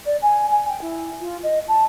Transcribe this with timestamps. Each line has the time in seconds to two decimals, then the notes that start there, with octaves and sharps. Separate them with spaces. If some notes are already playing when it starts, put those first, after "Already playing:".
0.05 D5
0.22 G#5
0.49 G#5
0.68 G5
0.81 E4
1.20 F4
1.43 D#5
1.68 A5